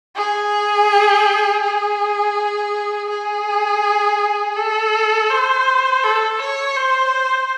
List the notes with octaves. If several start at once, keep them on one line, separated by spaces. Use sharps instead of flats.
G#4
G#4
G#4
A4
C5
A4
C#5
C5